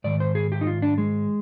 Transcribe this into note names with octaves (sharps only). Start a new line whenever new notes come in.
G#2 D#3 D5
C5
G#4
G4
D#4
F4
D4
G#3